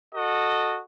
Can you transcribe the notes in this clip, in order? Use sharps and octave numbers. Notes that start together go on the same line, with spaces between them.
F#4 A4 D#5